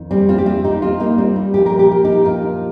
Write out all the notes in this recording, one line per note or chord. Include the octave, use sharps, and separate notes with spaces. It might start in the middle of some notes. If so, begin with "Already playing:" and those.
Already playing: F2 D#3
G3 C4
C4 F4
G4
C4 F4
D#4 G4
C4 F4
A#3 D#4
G3 C4
G3
A#2 F3 G4
A#4
G4
A#4
D#4 G4
F4 A#4